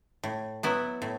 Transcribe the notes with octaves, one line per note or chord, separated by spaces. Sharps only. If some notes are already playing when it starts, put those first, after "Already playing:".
A2
F#3 B3 E4
A2